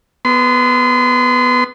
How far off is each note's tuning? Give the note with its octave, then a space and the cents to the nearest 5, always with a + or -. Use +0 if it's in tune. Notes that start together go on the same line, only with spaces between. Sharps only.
B3 +0 C6 -35